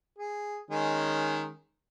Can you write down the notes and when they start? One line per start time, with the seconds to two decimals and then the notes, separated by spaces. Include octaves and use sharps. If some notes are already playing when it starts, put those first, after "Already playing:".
0.18 G#4
0.71 D#3 G#3 C#4